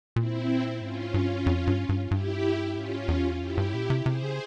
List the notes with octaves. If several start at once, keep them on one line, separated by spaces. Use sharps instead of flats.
A#2 C4 E4
G#2 C#4 F4
G2
F2
G2
G2
G2 E4 G4
G#2 C#4 F4
E2
F2 E4 G4
G2
A#2
C3
C3 G#4 C5
C#3